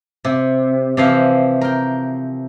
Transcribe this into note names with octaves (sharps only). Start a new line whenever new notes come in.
C3
C3 E3 F3 C5 F5
A#4 G5